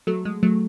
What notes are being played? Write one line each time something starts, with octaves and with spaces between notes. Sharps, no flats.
F#3 A3
G#3
F#3 A3